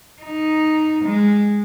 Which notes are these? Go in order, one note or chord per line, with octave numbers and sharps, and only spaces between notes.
D#4
G#3